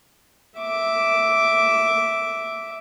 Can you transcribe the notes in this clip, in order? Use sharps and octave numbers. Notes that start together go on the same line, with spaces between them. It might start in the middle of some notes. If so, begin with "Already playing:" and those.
E5 D6